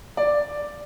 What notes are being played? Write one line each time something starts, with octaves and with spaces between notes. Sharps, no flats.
D5